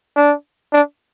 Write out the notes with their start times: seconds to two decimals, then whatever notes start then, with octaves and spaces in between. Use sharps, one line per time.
0.16 D4
0.73 D4